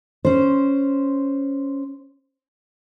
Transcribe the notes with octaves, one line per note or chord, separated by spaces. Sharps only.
C#4 C5